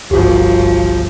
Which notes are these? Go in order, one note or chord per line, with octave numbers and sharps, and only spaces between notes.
G1 C2 F3 F#4 G4